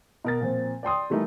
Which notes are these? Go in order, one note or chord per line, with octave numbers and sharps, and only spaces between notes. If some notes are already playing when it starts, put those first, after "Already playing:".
B2 A#4 A6
A#2 F3 C4
D5 G5 C6 D#6
E3 G3 A3 A#3 D#4 E4